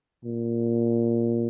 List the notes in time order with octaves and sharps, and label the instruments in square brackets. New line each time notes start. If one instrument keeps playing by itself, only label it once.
[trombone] A#2